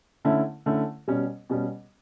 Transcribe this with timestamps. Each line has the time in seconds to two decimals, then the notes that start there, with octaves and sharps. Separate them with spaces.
0.25 D3 A3 C#4 E4
0.66 D3 A3 C#4 E4
1.08 B2 G3 C#4
1.50 B2 G3 C#4